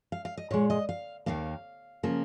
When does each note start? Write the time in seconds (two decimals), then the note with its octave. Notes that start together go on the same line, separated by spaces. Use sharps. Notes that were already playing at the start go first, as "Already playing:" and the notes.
0.12 F5
0.25 F5
0.37 D#5
0.51 A#2 G#3 C#5
0.70 D#5
0.89 F5
1.26 D#2 D#3 A#3 F5
2.03 C#3 F3 A#3